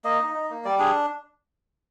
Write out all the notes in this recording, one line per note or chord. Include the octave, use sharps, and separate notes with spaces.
A#3 D#5
D#4
D#4
A#3
G3 D5
D4 G#4